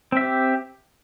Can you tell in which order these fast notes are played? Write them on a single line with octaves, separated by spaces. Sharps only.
C4 E5 G4